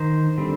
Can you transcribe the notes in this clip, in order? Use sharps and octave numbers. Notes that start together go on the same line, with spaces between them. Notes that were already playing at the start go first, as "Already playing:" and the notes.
Already playing: D#3 C5
D3 G3 C4